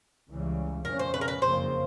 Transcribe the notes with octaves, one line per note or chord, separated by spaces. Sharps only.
C#2 C#3 E3 G3
F2 C#3 F3 A3 C#4 A#4
C5
B4
A#4
B4
F#1 F2 C#3 F3 A#3 C5